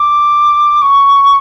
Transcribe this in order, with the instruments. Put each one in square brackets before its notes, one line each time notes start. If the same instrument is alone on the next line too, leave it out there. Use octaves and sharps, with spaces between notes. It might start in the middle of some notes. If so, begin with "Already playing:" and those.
Already playing: [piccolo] D6
C#6